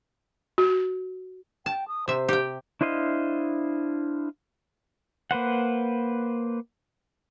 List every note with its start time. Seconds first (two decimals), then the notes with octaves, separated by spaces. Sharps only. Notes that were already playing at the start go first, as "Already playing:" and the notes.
0.58 F#4
1.66 G5 A5
1.88 D#6
2.08 C3 C5 E5
2.28 G4 G5
2.81 D4 E4 C5 D#5 F5
5.31 A#3 B4 C5 F#5